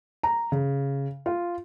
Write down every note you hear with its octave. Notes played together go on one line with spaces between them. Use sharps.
A#5
C#3
F4